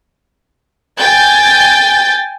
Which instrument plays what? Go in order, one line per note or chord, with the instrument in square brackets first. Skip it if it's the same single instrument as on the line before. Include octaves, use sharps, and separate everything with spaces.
[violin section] G5 G#5 G6 A6